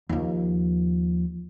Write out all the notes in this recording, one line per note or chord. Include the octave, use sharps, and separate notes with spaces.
D#2 F3